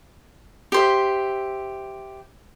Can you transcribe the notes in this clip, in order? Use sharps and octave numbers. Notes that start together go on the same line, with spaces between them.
G4 C5 E5